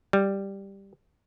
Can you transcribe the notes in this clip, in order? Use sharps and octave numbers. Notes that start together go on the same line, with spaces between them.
G3